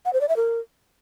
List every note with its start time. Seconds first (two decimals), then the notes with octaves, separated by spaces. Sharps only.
0.05 F#5
0.13 C5
0.21 D5
0.29 E5
0.36 A#4